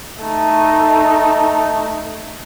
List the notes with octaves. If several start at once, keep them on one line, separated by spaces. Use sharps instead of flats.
A3 D#4